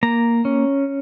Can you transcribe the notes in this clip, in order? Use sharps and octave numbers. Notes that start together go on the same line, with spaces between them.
A#3 A#5
C#4